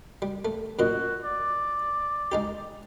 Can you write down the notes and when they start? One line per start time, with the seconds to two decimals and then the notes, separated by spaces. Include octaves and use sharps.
0.22 G3
0.45 A3
0.79 F#2 A#2 F#4 D#5
1.24 D5
2.32 G#3 D#4 G4